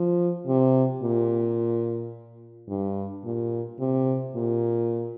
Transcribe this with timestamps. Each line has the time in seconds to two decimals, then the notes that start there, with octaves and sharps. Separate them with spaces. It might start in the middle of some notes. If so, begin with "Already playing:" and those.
Already playing: F3
0.47 C3
1.03 A#2
2.69 G2
3.24 A#2
3.79 C3
4.35 A#2